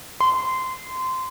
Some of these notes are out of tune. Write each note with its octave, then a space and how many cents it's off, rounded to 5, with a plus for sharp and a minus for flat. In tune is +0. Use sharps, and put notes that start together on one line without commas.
C6 -20